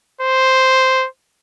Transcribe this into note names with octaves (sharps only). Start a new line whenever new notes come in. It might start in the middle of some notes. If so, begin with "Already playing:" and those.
C5